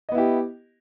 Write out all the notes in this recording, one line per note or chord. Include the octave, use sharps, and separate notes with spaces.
B3 E4 G4 D#5